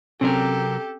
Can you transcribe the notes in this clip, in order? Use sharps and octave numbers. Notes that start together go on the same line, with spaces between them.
C3 F#3 C4 C#4 G4 A4 A#4